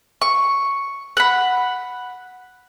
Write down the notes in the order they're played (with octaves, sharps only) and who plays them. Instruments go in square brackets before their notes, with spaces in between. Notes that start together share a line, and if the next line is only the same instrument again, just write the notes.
[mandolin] C#6
F#5 B5